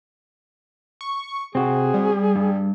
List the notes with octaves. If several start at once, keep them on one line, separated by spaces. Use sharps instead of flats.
C#6
C3 C4 F#4 G#4
G3
G2